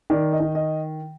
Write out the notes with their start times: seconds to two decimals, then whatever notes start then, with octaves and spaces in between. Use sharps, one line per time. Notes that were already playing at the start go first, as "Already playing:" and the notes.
0.10 D#3 D5
0.33 D#5
0.40 D#3
0.55 D#5